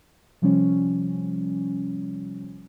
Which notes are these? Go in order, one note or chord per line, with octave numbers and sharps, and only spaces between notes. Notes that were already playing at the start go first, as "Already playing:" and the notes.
C3 F3 G3 C#4